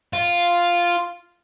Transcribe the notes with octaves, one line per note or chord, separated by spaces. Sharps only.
F4